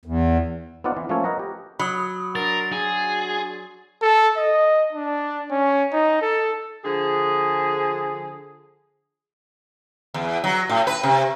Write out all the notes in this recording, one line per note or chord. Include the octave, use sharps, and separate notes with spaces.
E2
B3 C4 D#4 F4 D5 F#5
E3
F3 A3 A#3 C#4 A4 C#5
A#4 B4 D#5 F#5 A#5
G4
F#3 B5 D#6
D4 F#4 A#4 C6 A6
G#4
A4
D#5
D4
C#4
D#4
A4
D3 F3 G#4
E2
F#3
A2
B4
C3